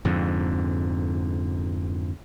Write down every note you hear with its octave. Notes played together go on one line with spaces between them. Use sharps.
F2 G#2 D3